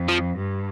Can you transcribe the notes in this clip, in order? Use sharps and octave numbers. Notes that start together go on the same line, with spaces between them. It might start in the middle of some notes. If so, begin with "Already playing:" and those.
Already playing: F2
F3
G2